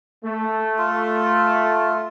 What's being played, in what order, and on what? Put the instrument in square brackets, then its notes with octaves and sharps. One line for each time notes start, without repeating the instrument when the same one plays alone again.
[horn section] A3
[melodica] F4